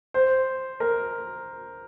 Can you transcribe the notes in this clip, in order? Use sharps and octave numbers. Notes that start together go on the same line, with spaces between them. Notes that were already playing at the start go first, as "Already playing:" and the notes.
C5
A#4